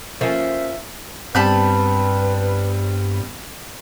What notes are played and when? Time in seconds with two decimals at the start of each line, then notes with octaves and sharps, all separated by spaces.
0.21 F3 A#3 C#4 E5
1.35 G2 G3 B3 C4 B4 A5 B5 G6